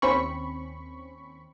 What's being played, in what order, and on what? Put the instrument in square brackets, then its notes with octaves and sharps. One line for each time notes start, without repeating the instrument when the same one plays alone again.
[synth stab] D#2 C4 C#4 B5 C#6